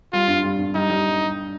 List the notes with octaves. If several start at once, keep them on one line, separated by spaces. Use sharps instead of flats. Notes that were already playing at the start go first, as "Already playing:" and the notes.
G3 F4
G2
G3
G2
G3 D#4
G3